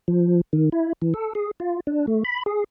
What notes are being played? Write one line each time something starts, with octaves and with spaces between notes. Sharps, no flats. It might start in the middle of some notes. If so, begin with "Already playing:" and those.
F3
D#3
E4
E3
A4
G#4
F4
D4
A3
B5
G#4